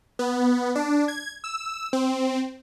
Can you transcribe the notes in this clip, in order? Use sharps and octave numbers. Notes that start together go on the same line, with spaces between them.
B3
D4
G#6
E6
C4